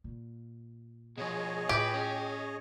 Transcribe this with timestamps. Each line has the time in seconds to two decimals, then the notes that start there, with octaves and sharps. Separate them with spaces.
0.04 A#2
1.18 B2 F3 G#4 C#5 D#5
1.69 A2 F4 G4 B4
1.94 C#4